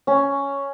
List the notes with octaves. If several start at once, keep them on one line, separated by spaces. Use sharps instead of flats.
C#4